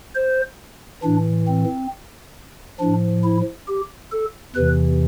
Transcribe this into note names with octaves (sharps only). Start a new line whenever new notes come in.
C5
A2 E3 D4
C4
A2 F3 D4
E4
G4
A4
E2 C3 E3 B4